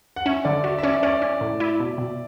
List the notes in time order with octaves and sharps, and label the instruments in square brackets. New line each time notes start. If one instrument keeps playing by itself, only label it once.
[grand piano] F#5
[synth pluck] C#4 [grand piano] E5
[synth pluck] D3 [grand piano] D5
[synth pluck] F#4 [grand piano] E5
[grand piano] E5
[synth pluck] C#4 [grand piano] D5
[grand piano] E5
[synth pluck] C#4 [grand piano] D5
[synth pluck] C#4
A2
E4
B2
B2